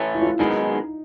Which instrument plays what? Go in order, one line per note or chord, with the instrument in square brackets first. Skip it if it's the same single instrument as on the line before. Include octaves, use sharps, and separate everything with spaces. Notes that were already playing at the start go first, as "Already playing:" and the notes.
Already playing: [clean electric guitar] A2 E3 A3 C#4 [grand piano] E4
[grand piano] E4
F4
E4
[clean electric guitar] F#2 D#3 G#3 B3 [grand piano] D#4